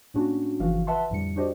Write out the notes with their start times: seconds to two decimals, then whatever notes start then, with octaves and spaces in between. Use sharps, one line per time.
0.14 A2 A#3 C#4 D4 F#4
0.59 G1 C#3 E3 F3 F#4 F5
0.87 B4 E5 F#5 A5 C6
1.10 F2 A2 D3 G3 C#7
1.36 D4 F#4 G4 C5 D5 D#5